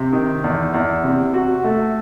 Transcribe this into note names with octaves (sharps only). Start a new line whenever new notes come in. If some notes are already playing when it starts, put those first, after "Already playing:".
Already playing: C3
D#3
E2
E2
C3
F#4
A3